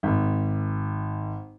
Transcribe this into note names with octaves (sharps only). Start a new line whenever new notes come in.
G#1